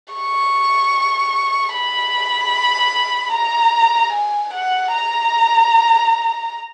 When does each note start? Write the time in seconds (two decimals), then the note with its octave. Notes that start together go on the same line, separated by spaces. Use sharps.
0.14 C#6
1.73 B5
3.33 A#5
4.13 G#5
4.53 F#5
4.92 A#5